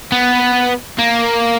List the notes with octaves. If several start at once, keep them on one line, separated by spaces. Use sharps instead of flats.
B3
A#3